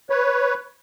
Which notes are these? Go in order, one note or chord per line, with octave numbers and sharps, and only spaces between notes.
B4 C#5